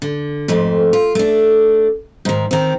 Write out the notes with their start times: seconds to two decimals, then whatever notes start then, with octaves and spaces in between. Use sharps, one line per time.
0.02 D3
0.48 F2 G#2 A3
0.93 F4
1.15 A3 D4
2.25 G#2 D#3
2.51 D#3 C4